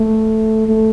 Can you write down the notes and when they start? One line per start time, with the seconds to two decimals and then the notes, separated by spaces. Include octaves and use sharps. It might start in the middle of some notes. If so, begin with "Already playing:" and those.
Already playing: A3
0.68 A3